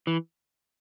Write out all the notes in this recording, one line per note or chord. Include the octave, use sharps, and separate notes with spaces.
E3